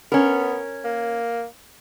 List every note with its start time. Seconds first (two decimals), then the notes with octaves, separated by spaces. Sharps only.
0.12 B3 C#4 A#4
0.84 A#3